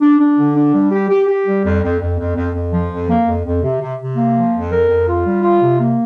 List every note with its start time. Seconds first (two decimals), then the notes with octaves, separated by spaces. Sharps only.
0.01 D4
0.19 D4
0.37 D3
0.55 D4
0.74 G3
0.92 G4
1.10 G4
1.28 G4
1.46 G3
1.64 F2
1.82 F2
2.00 F2
2.18 F2
2.36 F2
2.54 F2
2.72 F3
2.90 F2
3.09 A#3
3.27 F2
3.45 F2
3.63 C3
3.81 C3
3.99 C3
4.17 A#3
4.35 F3
4.53 F2
4.71 A#4
4.89 F2
5.07 F4
5.25 G3
5.43 F4
5.61 C3
5.79 A#3